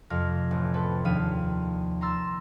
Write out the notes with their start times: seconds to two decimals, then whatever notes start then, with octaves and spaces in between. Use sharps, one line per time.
0.10 F2 C3 F5 A#6
0.51 A1
0.74 C4 A4 B4
1.05 A#1 D#2 F3 F5 B6 D#7
2.01 A#5 C6 E6 A6